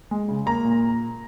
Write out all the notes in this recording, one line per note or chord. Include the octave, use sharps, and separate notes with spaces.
G#3
C#3
A#3 A#5
A#2